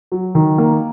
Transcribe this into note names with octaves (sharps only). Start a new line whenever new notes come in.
F#3
D#3
A#3